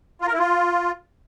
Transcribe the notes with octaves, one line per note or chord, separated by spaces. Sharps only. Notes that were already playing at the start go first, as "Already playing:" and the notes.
F4
A#4
E4
F4